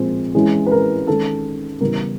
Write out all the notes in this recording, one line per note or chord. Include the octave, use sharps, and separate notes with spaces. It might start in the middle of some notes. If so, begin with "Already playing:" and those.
Already playing: A#2 F3 G#3 C4
E3 G#3 C#4
B4
A#4
D#3 G#3 C#4 A4
C#3 E3 G3 B3 A#4